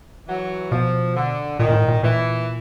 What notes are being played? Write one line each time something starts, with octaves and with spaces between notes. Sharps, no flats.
E3 F#3
B2 F3
D3
A#2 D#3
A#2
A2
A#2
A#2 E3